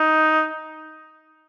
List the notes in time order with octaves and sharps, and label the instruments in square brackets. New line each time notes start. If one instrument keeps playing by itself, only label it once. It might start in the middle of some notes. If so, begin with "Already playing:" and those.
Already playing: [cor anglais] D#4